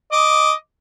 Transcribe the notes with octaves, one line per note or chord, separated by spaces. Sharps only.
D#5 D6